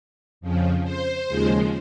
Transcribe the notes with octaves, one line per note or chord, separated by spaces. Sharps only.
F2 C#3 F3
C5
D#2 C#3 F3 G#3